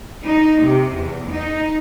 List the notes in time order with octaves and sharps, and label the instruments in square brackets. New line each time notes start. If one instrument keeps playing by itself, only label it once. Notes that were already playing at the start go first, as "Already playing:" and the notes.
[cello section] D#4
C3
E2
D#4